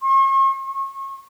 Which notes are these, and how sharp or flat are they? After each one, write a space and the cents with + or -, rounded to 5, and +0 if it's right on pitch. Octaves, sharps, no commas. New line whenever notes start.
C#6 -45
C#6 -35